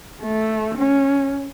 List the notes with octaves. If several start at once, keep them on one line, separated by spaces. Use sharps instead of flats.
A3
C#4